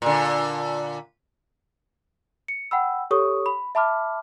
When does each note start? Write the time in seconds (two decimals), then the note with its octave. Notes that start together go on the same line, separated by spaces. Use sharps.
0.02 A#2 D3
2.48 C#7
2.71 F#5 G5 B5 E6
3.11 G4 A4 C#5 C#6 D#6
3.46 B5
3.75 E5 A5 B5 D6 F6